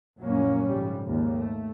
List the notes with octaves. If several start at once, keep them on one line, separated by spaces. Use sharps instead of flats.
A#1 F#2 A2 F#3 A#3 C#4
F2 G#2 C#3 G3
G#1 D#2
A3